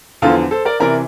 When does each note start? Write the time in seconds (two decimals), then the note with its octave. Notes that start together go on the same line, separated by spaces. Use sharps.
0.22 E2 D3 F3 F4 A4
0.51 A4 C5
0.65 A#4 D5
0.80 C3 E3 A#4 D5